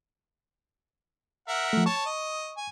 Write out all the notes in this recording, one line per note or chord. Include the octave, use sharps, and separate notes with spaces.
A#4 E5 F#5
F3 A3
C#5 A5 C#6
D#5
G#5